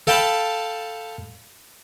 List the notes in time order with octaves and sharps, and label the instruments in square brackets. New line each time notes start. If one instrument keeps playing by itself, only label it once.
[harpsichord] A4 F5 G5 A5 B5